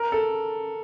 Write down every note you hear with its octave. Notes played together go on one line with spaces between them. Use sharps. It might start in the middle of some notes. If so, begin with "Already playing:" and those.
Already playing: A#4
A4